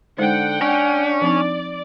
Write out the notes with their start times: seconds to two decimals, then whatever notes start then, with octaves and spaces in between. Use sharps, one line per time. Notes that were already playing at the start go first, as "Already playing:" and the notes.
0.18 D3 G#3 D#4 C5 F#5 G5
0.61 C#4 D4
1.22 F3 C4 D#4 D5